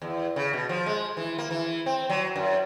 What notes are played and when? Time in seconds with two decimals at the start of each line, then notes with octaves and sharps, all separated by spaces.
0.02 E2
0.36 C#3
0.53 B2
0.69 F3
0.86 G#3
1.17 E3
1.38 A#3
1.51 E3
1.86 C4
2.10 F#3
2.36 F#2